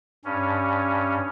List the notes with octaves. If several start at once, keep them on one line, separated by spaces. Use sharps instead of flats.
G2 C#4